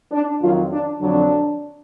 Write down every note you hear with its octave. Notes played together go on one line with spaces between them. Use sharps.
D4
F2 D#3 F#3 F4
D4
F2 D3 F#3 D4